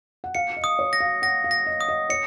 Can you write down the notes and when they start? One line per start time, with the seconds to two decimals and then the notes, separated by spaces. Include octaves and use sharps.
0.24 F#5
0.35 F5 C#7
0.57 D#5
0.64 D#6
0.79 C#5
0.93 A#6
1.00 F5
1.22 F#5 A#6
1.44 F5
1.51 A#6
1.66 D#5
1.81 D#6
1.89 D#5
2.09 C#5 C#7